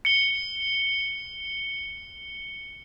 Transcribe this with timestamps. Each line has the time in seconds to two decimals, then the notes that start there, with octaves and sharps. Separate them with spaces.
0.05 C#7 G7